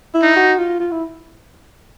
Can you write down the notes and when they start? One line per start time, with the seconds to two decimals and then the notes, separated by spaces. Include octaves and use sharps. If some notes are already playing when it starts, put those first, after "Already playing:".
0.14 E4
0.22 D#4
0.36 F#4
0.58 F4
0.80 F4
0.92 E4